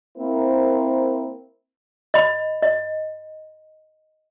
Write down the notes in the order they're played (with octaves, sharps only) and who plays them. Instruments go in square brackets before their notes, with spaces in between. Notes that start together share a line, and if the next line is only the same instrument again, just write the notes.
[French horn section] A#3 C4 E4 A#4 C5
[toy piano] D#5 B5
D#5